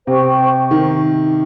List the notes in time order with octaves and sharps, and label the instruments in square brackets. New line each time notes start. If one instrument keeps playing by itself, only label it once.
[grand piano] C3 [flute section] C5 G5 C#6
[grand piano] D#3